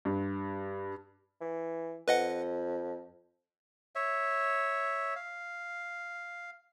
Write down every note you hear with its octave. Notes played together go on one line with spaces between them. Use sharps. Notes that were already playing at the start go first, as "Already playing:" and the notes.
G2
E3
F2 B4 D#5 F#5
C#5 E5
F5